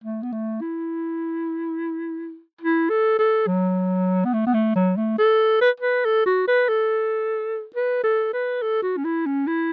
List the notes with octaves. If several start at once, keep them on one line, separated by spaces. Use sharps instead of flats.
A3
B3
A3
E4
E4
A4
A4
F#3
B3
A3
B3
A3
F#3
A3
A4
B4
B4
A4
F#4
B4
A4
B4
A4
B4
A4
F#4
C#4
E4
C#4
E4